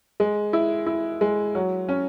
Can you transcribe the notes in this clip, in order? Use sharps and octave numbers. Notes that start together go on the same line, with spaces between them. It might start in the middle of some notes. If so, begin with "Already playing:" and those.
G#3
E4
E4
G#3
F#3
C#4